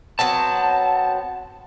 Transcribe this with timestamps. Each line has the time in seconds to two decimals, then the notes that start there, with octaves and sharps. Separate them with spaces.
0.19 F#3 B3 C4 A5